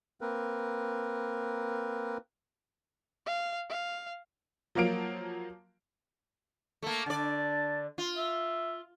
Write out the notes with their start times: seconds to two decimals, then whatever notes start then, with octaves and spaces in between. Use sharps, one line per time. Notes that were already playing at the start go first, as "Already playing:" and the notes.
0.21 A#3 C4 A#4 B4
3.26 F5
3.70 F5
4.75 F3 F#3 A#3 F5 D7
6.82 A3 A#3
7.06 D3 D5 A5
7.98 F4
8.17 E5